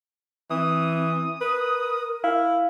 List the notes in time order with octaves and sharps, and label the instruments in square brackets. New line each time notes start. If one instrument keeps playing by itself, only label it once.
[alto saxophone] E3 [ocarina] C4 [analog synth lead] D#6
[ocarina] A#4 [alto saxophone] B4
[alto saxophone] E4 [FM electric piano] F5